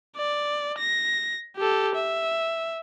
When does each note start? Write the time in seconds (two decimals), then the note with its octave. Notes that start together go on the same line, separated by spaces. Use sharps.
0.17 D5
0.78 A#6
1.57 G4 A4
1.95 E5